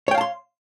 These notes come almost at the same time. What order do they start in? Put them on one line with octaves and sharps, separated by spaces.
C#5 G5 F5 A5 C6